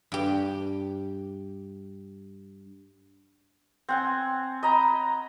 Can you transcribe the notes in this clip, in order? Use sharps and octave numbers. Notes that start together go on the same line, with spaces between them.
G2 G4
C4 F#5 G#5
D#5 A#5 B5